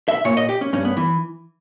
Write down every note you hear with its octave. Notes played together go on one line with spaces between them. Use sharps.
E5
A#2 C#5
D#5
G4
C#4
G2 C#4
B3
E3